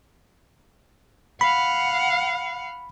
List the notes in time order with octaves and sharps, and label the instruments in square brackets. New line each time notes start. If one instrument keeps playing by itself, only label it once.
[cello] F5 F#5 [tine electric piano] B5